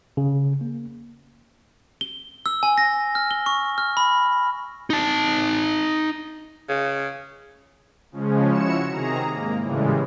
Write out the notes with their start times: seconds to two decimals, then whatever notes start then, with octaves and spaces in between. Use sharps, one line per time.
0.17 C#3
0.61 A#3
2.01 G7
2.46 E6
2.63 G#5
2.78 A#6
3.15 F6
3.31 G7
3.46 C#6
3.78 F6
3.97 B5
4.90 D#4 A5
6.69 C#3
8.12 C#3 F3 G#3 C#4
8.50 E4 F#4 C#5 C#7 E7
8.89 C3 D#3 G#4 A#5
9.28 G#2 A#3
9.60 A2 C#3 E3 G3 G#3